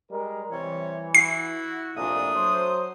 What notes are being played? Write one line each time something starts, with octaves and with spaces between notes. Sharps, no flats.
G3 G#3 A#4
C3 E3 G3 C#5
E4 F#4 C7
C2 F2 A#2 A3 D4 D#6
F#3 F#4 C5